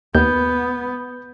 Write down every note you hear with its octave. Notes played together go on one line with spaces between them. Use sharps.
D#2 B3 G6